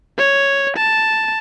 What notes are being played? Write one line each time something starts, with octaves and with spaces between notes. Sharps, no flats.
C#5
A5